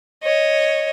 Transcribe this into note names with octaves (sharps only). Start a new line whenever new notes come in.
C#5 D#5